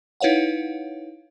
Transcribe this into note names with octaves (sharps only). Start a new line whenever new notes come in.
D#4 E4 B4 C#5 F5 F#5